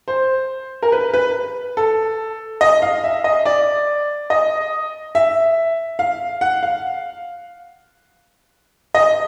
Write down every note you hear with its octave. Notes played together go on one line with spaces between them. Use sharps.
C5
A#4
B4
B4
A4
D#5
F5
E5
D#5
D5
D#5
E5
F5
F#5
F5
D#5